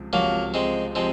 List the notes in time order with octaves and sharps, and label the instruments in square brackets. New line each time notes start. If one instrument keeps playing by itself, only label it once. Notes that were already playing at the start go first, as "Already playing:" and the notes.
Already playing: [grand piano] C#2 C3 F3
[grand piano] C#2 C3 F3 [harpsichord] F#3 A#3
[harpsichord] G#3 C4
[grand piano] C3 F3 [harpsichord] G#3 C4